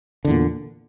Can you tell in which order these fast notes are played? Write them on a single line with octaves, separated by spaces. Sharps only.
D3 E2 A#2